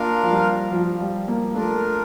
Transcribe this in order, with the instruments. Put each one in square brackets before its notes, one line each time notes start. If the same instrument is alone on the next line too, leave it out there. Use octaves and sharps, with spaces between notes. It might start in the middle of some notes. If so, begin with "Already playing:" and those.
Already playing: [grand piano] A#3 [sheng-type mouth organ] D4 F4 A#4 F5
[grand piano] F3
G3
F3
G3
A#3
[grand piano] A3 [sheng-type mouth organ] D4 F4 A#4